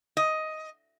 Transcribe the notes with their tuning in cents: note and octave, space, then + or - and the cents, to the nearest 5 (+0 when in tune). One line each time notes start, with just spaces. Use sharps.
D#5 +10